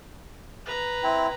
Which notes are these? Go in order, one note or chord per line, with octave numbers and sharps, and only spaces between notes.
B4 A#5
C4 E4